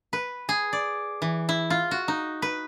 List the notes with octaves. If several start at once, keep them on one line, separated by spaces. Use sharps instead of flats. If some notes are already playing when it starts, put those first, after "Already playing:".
B4
G#4
D5
E3
E4
F4
F#4
D#4
B4